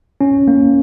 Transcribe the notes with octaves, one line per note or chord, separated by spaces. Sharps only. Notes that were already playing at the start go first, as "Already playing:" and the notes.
C#4
A#3